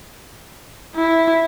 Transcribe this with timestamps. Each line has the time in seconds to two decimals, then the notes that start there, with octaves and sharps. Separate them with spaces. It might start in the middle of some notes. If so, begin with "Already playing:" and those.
0.96 E4